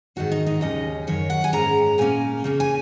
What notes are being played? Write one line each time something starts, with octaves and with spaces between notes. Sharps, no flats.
G#2 D#3 A#3 F#4
D#4
D#4
D#2 C#3 F#3 C#4 D#5
F#2 D#3 F#3 C#5
F#5
G#5
G#2 G#3 C#4 A#5
A#2 A#3 C#4 G#5
C#3 A#3 C#4
G#5